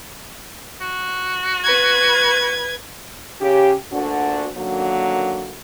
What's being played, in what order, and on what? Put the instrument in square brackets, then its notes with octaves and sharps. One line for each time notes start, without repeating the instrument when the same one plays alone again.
[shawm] F#4
[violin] B4 G#6
[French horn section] C#3 G4
D2 A#2 D3 D4 F#4
F#2 D3 D#3 F#3 A#3